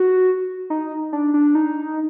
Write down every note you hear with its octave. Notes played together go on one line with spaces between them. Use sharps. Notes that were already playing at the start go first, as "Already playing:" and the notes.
Already playing: F#4
D#4
D4
D4
D#4